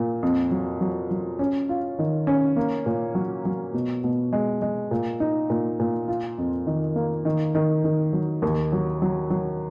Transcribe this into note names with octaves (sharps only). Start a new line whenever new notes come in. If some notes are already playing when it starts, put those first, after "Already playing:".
Already playing: A#2
F2
F#3
F#3
F#3
C#4
F4
D#3
C#4
A#3
A#2
F#3
F#3
B2
B2
G#3
G#3
A#2
D#4
A#2
A#2
F4
F2
D#3
A#3
D#3
D#3
D#3
F#3
D#2
F#3
F#3
F#3